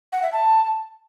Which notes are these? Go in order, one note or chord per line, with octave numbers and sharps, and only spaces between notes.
F#5
E5
A5